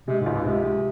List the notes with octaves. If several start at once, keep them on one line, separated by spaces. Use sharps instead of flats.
C3 G#3
G#2
C#2
G#2
C3 G#3
G#3